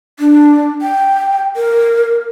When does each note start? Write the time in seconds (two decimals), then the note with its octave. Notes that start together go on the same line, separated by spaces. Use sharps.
0.19 D4
0.82 G5
1.56 A#4